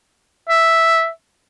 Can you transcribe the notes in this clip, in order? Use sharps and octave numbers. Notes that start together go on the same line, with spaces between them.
E5